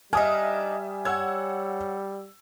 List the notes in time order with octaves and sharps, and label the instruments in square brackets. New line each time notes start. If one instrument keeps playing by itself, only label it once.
[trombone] G3 [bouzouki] D4 D#4 [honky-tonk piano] E5 D#6 F6 [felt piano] G#5
[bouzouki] C#5 [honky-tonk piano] F#5 E6 G#6